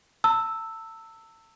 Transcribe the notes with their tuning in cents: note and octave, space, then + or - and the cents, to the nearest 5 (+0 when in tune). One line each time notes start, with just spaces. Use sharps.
A5 +40 E6 +0